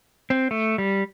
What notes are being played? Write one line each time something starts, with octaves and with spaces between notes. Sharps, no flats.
C4
A3
G3